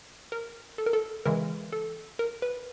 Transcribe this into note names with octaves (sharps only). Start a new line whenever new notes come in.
A#4
A4
A#4
A4
C#3 E3 G#3 A#4
A4
A#4
B4